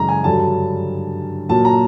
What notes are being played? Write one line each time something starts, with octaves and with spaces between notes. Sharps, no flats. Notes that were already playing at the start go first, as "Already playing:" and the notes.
Already playing: F#2 C#3 E3 G#3 A#5
G#5
G2 D3 F#3 A5
A#2 F#3 A5
A#5